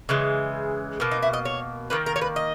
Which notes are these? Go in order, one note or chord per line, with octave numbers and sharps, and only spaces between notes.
C#3 E3 G#3
B2 A#3
D#4
E4
D#5
C#5
D#3 A#3 B4
A#4
C#5
B4
D#5